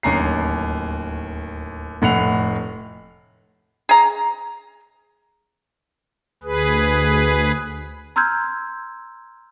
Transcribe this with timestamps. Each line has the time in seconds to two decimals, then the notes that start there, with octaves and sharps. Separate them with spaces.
0.03 D1 D#2 C#4 A#5 C7
2.02 F1 A2 F#5 F7
3.89 G#4 A#5
6.43 D2 G#4 B4
8.16 A#5 C6 E6 F6 G6 G#6